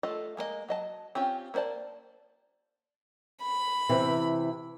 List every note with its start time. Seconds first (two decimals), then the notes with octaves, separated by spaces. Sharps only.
0.03 A3 F4 A4 D#5
0.37 G#3 A#3 A#4 D#5
0.68 F#3 D#5 A5
1.15 C4 C#4 F4 G4
1.54 A#3 D#4 C5 D5 A5
3.42 B5
3.89 C3 E3